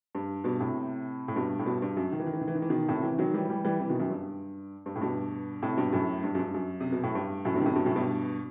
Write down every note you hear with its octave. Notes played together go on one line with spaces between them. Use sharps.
G2
G2 B2
A2 C3
A2
G2 B2
A2
G2 B2
G2
F#2
D#3
E3
D#3
E3
D#3
E3
D#3
E3
B2 D#3
A2 C3
C3 E3
D#3 F#3
E3 G3
E3 G3
E3 G3
C3 E3
B2 D#3
F#2
G2
G2
A2
G2 B2
A2 C3
G2 B2
F#2 A2
G2
F#2
G2
F#2
C3
B2
A2
G2
F#2 A2
G2 B2
D#3
A2 C3
G2 B2
F#2 A2
G2 B2